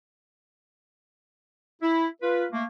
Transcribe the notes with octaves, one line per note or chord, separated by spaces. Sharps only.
E4
F4 B4
A3 A#3